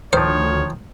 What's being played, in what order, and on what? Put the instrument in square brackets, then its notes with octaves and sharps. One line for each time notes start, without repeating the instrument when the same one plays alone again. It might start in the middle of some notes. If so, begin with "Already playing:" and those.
[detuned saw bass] D2 [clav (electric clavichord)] D#3 F3 [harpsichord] C5 [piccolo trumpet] C#5